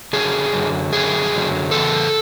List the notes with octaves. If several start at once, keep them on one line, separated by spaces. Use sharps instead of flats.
F#2 D3 F#3 G#4
F#2 D3 F#3
F#2 D3 F#3 G#4
F#2 D3 F#3
E2 C#3 A4